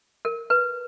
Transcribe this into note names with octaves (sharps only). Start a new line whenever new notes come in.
A#4
B4